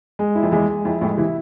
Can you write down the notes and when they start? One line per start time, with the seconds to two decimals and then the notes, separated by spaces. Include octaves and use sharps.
0.19 G#3
0.35 E4
0.43 F2
0.52 E2 G#3
0.68 G#3
0.85 F2 E4
1.01 F2 A2 G#3
1.17 C3 E3 E4